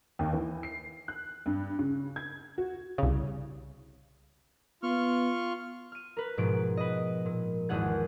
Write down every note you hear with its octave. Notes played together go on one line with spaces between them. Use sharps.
D#2
E3
C7
F#6
G2
C#3
G#6
F#4
C2 C#3
B3 F4 C#6 F6
F6 D#7
A#4 B4
G#2 B2 F3 G#4 D7
B4 D#5
A#2
G#1 E2 G#4 F#5 G#6